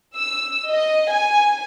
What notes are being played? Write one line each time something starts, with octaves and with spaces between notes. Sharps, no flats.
E6
D#5
G#5